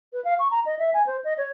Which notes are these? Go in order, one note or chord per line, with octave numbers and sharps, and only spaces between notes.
B4
F5
C#6
A#5
D#5
E5
G#5
C5
D#5
C#5